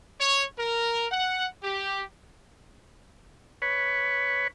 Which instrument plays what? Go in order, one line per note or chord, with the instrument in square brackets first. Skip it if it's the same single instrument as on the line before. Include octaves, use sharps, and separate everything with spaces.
[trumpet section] C#5
A#4
F#5
G4
[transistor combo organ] B4 C#5